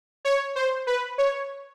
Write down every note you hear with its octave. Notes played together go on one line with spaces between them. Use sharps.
C#5
C5
B4
C#5